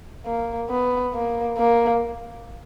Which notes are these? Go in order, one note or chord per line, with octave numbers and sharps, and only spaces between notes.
A#3
B3
A#3
A#3